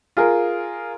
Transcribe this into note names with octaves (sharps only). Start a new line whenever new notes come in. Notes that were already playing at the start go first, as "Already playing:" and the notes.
F4 G#4 A#4